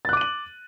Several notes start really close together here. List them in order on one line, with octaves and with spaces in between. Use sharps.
A6 F#6 D6 D#7 F#7